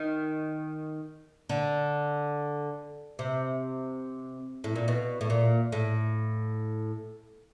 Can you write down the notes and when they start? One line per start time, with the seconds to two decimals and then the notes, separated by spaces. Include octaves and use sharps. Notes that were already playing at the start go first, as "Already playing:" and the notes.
Already playing: D#3
1.49 D3
3.19 C3
4.64 A2
4.76 A#2
4.88 B2
5.21 A2
5.30 A#2
5.72 A2